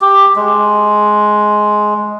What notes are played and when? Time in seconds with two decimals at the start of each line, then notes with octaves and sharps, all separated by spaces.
0.01 G4
0.36 G#3